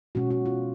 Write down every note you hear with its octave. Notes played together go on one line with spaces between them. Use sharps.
B2 G#3 C#4 F#4
F#4
F4